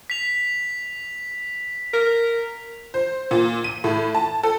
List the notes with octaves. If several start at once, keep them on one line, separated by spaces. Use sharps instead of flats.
B6 F7
A#4
C5
A#2
D#7
A2
A5
A4